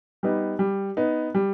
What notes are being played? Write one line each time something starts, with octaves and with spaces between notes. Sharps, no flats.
G3 B3 D#4
G3
B3 D#4
G3